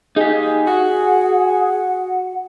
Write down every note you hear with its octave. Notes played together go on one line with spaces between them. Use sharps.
D#4 G4 G#4
F#4 F#5